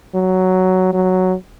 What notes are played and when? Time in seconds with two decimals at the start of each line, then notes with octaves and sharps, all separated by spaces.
0.15 F#3
0.93 F#3